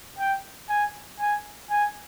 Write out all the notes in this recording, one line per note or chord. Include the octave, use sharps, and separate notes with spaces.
G5
G#5
G#5
G#5